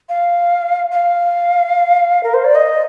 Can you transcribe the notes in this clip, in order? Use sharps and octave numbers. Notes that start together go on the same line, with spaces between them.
F5
F5
A#4
C5
D5
D#5